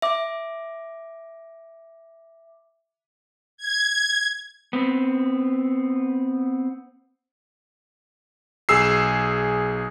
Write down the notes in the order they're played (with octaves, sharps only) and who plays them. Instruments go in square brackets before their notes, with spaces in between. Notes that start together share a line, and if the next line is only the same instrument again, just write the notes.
[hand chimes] E5 D6
[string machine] G#6
[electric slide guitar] B3 C4
[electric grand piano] B1 G#4 E6 C7